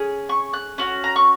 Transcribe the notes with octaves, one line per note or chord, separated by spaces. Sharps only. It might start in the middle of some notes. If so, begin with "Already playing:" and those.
Already playing: C#4 G#4
C#6
F#6
C#4 F#4
A#5
C#6